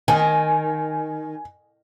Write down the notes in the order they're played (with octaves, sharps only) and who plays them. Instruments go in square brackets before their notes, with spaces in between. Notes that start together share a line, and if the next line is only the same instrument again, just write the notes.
[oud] D#3 [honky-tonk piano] G#5